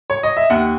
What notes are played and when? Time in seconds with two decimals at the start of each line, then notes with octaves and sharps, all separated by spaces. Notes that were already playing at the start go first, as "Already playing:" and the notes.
0.10 C#5
0.23 D#5
0.37 E5
0.50 D#2 F#5